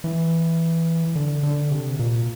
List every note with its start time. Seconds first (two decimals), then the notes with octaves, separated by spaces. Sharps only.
0.04 E3
1.16 D3
1.43 D3
1.70 C3
1.99 A#2